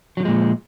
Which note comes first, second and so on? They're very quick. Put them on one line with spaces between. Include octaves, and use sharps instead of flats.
F#3 D3 F3 G#3 A#2